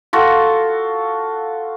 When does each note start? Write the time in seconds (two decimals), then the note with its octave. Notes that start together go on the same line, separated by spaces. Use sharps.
0.13 F4 F#4 A4